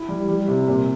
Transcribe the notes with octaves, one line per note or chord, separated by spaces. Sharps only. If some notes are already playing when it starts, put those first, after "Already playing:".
Already playing: E4
G3
G3
C3
A#2